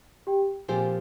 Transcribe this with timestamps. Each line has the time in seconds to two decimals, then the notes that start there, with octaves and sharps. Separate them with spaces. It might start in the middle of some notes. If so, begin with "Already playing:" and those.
0.27 G4 G5
0.68 A#2 F3 C4 G4 G#4 C5 G#5